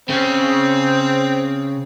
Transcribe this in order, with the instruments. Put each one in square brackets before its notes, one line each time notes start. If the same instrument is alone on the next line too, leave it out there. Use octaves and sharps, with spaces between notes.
[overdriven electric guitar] C#3 [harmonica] C4